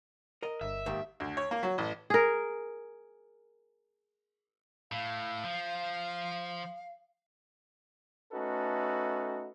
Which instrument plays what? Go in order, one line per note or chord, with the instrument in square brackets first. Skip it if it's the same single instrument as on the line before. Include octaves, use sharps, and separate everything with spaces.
[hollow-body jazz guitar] A#4 D#5
[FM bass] G1 [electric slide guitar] E5
[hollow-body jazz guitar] D#2 G#2 D#3
[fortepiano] D2
C#5
A#3
F#3
A1
[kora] G#4 A#4
[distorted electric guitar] A2 [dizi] F5
[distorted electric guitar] F3
[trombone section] A3 C#4 D#4 F#4 A4 B4